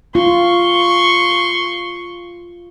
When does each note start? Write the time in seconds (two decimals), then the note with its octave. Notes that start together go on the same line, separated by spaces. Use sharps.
0.15 F4 C6 C#6